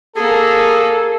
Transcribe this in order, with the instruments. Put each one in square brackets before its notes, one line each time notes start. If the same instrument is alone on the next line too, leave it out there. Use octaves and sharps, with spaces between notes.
[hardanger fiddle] A#3 [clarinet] G#4 [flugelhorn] A4